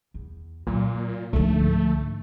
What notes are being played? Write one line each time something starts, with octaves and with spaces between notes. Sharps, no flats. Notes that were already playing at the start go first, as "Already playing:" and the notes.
E2
A#2 F#3 A#3
C#2 G#2 D3 F3 A3